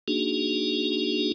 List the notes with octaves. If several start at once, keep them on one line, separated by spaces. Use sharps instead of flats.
A#3 D4 D#4 F#4 G#4